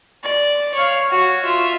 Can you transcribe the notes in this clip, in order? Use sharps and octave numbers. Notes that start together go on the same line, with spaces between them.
D5
C#5 F5
F#4 C#5
F4 E5